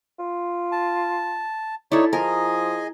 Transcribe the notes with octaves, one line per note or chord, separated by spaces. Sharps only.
F4
A5
D#4 E4 A4 C#5 D5
F3 G#4 A#4 D#5 G#5